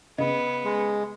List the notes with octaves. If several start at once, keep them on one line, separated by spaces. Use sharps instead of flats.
C#3 B3 D#5
G#3